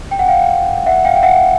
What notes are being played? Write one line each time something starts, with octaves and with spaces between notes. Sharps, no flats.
G5
F#5
F5 G5
E5 F#5
F5 G5
G5
E5 F#5